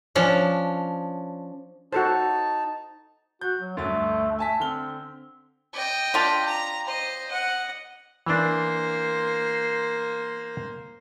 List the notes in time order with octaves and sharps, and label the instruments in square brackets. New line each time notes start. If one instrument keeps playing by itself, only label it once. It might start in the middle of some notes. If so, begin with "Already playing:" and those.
[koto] F3 C#4 D4
[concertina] D#4 A5 [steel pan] F#4 A4 C5
[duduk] F#4 [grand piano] G6
[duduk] F#3
[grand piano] D2 G2 A6 [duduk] A3
[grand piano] G#5 A5 B6
[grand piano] D3 F6 G7 [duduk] C4
[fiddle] D#5 G5
[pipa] D4 F4 G4
[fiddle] A#5
C5 D#5
D#5 F#5
[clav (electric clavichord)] E3 D4 [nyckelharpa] A#3 C5